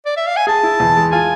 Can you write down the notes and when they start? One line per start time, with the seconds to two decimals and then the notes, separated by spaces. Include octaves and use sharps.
0.06 D5
0.17 E5
0.27 F5
0.37 G#5
0.47 G#4 A5
0.63 E4
0.80 E2
0.96 G#3
1.12 F4 G#5